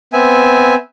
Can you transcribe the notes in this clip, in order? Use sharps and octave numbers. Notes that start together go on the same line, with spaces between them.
B3 C4 E5 G#5